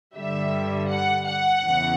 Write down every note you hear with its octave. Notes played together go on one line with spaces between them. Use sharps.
G2 D3 G3 E5
F#5
F#5
E2 C#3 E3